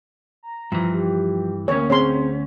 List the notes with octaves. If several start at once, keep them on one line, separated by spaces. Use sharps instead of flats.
A#5
G2 E3 F3
G4
D2 A#3 C#4 C#5
C4 G#4 C5 C#5 A#5 C6